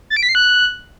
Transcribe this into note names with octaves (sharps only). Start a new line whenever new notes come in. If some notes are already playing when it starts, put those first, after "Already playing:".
A6
D7
B6
C7
F#6